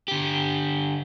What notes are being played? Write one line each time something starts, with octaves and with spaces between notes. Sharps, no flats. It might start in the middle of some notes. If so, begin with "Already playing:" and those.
D3 G4